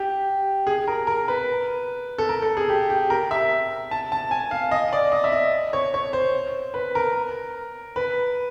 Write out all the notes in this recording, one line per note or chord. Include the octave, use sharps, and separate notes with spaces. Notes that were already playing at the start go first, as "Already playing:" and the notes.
Already playing: G4
G#4
A#4
A#4
B4
A4
A#4
A4
G#4
G4
G4
A#4
E5
A5
A5
G#5
F5
D#5
D5
D#5
E5
D#5
C#5
C#5
C5
B4
A#4
B4